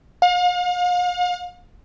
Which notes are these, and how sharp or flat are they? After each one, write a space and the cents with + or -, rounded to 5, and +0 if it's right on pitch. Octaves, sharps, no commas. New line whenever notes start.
F5 +40